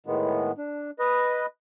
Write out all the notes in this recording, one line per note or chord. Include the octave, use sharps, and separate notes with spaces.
A2 D#3 G#3 B3
D4
B4 D#5